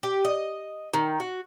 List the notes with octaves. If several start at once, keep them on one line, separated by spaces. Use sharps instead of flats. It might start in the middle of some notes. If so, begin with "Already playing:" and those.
G4
D#5
D#3
F#4